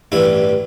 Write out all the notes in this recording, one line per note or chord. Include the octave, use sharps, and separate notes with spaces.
A1 G2 E3 E4